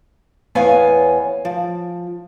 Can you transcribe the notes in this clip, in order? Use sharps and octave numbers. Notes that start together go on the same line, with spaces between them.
E2 B3 C#5 F5 G#5
F3